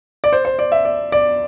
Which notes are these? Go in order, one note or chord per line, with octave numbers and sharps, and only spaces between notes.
D5
C5
C5
D5
E5
D5
D5